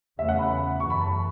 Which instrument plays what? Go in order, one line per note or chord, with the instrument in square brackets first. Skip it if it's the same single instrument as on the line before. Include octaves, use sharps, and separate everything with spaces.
[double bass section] E2 C#3 A3 C#4 [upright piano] E5
[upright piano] F#5
B5
[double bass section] F#2 E3 A3 [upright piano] C#6
[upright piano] B5
A5